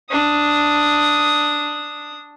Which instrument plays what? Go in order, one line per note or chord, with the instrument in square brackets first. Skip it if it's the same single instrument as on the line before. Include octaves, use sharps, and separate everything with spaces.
[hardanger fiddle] D4 D#6